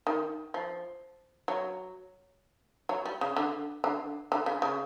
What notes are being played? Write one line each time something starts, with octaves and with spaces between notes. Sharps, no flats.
D#3
F3
F#3
F#3
G3
C#3
D3
D3
D3
C#3
C#3